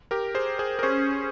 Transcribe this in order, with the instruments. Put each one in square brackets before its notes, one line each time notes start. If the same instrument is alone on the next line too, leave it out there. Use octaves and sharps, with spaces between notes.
[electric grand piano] G4 A#4
G#4 C5
G#4 C5
A#4
[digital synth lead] C#4 [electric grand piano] G#4 C5